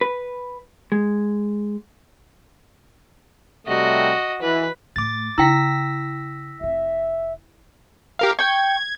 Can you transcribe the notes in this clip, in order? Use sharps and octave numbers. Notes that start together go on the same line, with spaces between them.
B4
G#3
C3 G3 A3 F#4 D#5
E3 B4
A2 A3 D6 A6
C#3 E4 G5 E6 A#6 B6
F1 C4 E5
G4 A#4 F5
G5 C#6 G#6